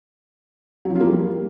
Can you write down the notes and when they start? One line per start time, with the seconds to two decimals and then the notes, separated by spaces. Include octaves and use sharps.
0.85 F#3
0.90 F3
0.95 F4
1.01 A#3
1.06 G3